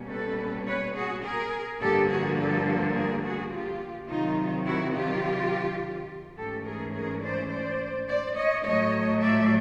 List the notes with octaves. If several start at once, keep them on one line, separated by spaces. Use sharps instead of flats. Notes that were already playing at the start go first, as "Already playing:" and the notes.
Already playing: B2 G3 A#3 C#4
A4 B4
B4 C#5
F#4 G#4
G#4 A#4
G2 D3 F3 A#3 G4 A4
F#4 G#4
G4 A4
G#4 A#4
F#4 G#4
F4 G4
C3 D#3 F#3 D#4 F4
E4 F#4
F4 G4
G#2 E3 A3 C#4 G4 A4
G#4 A#4
G#4 A#4
C5 D5
C5 D5
C5 D5
C#5 D#5
A2 F#3 A3 C#5 D#5
D5 E5